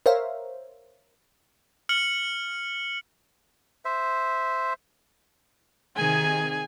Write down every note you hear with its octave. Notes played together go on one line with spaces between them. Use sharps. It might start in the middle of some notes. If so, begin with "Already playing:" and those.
A#4 C5 C#5 E5 F5
F6 C#7 F#7
C5 E5
C3 D#3 G#4 G#5